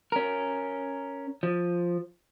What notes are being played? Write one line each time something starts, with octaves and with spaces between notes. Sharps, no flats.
C#4 A#4
F3